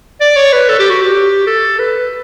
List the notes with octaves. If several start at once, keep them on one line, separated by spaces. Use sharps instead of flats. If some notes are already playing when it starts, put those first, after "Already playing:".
D5
C#5
B4
A4
G4
F#4
G4
A4
B4